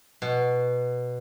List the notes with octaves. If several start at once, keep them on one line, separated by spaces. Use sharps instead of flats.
B2